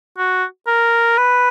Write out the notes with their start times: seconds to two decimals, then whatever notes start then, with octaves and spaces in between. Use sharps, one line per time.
0.18 F#4
0.67 A#4
1.18 B4